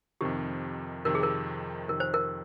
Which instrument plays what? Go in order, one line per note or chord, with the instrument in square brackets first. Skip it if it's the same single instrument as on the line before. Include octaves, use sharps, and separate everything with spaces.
[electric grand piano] F2 C3 D#3 [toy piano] G4
[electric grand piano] F2 C3 D#3 [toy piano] A#4
[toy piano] G#4
A#4
[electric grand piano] F2 C3 D#3 [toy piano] A#4
[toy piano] C5
A#4